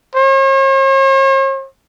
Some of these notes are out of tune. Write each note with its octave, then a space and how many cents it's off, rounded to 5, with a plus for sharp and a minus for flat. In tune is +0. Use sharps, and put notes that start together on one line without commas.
C#5 -45